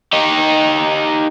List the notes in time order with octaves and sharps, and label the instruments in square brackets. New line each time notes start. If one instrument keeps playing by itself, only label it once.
[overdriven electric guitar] D#4 G4